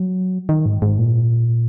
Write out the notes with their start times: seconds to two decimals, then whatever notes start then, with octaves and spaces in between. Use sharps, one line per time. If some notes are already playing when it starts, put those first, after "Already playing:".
Already playing: F#3
0.49 D#3
0.66 G#2
0.82 G#2
0.99 A#2